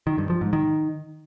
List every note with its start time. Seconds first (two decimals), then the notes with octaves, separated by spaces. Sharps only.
0.07 D#3
0.18 G2
0.30 F3
0.41 G#2
0.53 D#3